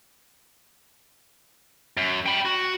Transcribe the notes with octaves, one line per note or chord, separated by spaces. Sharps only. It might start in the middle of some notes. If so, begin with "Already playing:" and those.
F#2
G5 B5
F#4